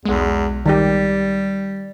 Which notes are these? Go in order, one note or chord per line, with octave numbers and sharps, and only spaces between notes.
B1 E2 G#3
D#3 G3 G4